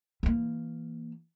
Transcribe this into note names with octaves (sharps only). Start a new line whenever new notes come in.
E3 A#3